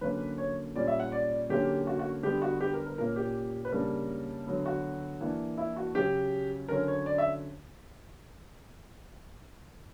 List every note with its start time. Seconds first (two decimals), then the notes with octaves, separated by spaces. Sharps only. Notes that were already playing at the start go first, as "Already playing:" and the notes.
0.01 D3 F#3 A#3 C#4 B4
0.38 C#5
0.75 A#2 G3 C#4 D5
0.87 E5
1.00 F#5
1.12 D5
1.49 D3 F#3 A#3 C#4 G4
1.87 F#4
1.99 F#4
2.23 D3 G3 B3 G4
2.42 F#4
2.61 G4
2.74 A#4
2.86 A#4
2.98 A#2 A#3 C#4 A#4
3.16 G4
3.65 B4
3.72 C#3 G3 A#3 D4 A#4
4.46 D3 F#3 B3
4.66 F#4
5.21 E3 A#3 D4
5.57 E4
5.76 F#4
5.95 C#3 F#3 C#4 G4
6.68 D3 F#3 C#4 A#4
6.88 C#5
7.06 D5
7.18 E5